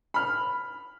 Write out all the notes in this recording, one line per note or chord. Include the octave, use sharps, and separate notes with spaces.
B5 F6